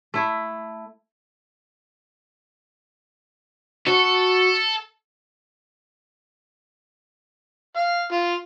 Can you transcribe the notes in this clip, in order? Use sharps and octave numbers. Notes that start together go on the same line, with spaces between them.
A3 E4
F#4 A4
F5
F4